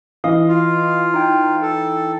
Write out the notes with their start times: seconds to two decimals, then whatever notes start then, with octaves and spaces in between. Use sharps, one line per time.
0.24 E3 D#5 F5 D#6
0.48 F4
1.14 D#4 G5
1.62 A4